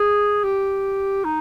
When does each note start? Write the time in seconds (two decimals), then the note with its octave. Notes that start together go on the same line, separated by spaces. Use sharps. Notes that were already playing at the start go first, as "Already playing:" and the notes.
Already playing: G#4
0.44 G4
1.24 D#4